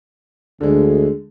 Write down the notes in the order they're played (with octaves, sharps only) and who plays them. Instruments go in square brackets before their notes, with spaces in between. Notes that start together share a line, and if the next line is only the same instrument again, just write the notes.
[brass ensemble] D2 [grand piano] D3 G#3